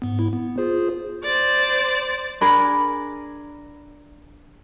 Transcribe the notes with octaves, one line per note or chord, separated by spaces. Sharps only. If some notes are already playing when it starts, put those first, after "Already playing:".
G#2 B3
G#2 E4
B3
F4 G#4 C5
C5 D5
D4 G#4 A#4 B5